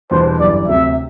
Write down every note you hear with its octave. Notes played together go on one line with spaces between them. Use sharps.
E2 B2 G3 B3 D4 C5
G1 F#2 E3 G3 D5
D2 C3 F#3 E5